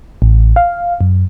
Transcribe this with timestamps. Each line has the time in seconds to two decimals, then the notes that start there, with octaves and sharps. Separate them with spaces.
0.22 A1
0.56 F5
1.01 F#2